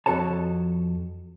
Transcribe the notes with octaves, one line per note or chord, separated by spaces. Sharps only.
F2 F#4 A4 C#5 A5